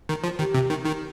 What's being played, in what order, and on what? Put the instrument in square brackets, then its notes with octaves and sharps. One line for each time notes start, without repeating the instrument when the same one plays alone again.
[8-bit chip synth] D#3
F3
[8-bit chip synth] D#3 [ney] G4
[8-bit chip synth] C3
D#3
D#3